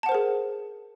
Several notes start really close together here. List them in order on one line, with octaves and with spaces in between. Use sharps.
A5 F#5 C5 A#4 G#4